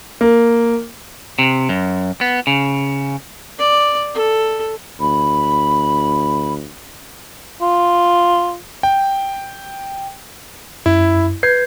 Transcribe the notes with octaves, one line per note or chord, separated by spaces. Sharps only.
A#3
C3
F#2
B3
C#3
D5
A4
D2 B5
F4
G5
F#2 E4
B4 G6 G#6 C7